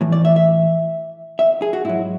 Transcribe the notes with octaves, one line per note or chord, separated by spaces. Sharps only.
A2 E3
D5
E5
E5
E5
G#4
F#4
G#2 F#3 E4